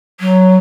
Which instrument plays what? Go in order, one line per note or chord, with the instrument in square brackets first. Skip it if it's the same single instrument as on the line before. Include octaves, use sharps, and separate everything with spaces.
[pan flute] F#3